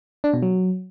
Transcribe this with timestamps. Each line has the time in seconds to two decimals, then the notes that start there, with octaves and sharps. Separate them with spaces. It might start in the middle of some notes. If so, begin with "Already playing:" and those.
0.24 D4
0.33 B2
0.42 F#3